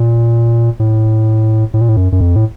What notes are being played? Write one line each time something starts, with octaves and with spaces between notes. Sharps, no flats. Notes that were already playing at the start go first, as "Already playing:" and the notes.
Already playing: A#2
A2
A2
A#2
A2
F#2
F#2
F2
A2